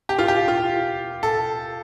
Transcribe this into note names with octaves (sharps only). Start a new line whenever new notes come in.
G4
F4
G4
F4
A4